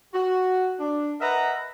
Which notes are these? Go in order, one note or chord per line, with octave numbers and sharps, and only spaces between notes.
F#4
D4
A#4 B4 D#5 E5 F#5 A#5